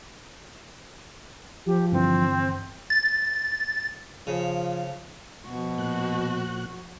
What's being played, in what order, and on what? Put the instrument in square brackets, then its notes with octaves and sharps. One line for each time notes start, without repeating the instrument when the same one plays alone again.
[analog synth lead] F3 [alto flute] G4
[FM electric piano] G2 D3 E3 [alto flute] C4
[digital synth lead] A6
[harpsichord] C#3 [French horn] F3
[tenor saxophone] B2 [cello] F3 F#4
[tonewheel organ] A#2 F#6